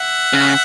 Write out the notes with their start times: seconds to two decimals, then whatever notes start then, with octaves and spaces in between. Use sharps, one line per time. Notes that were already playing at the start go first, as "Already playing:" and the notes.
Already playing: E5 F#5
0.33 C#3